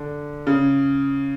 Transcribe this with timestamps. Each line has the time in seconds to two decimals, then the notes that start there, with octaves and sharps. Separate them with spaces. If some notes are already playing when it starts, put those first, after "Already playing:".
Already playing: D3
0.47 C#3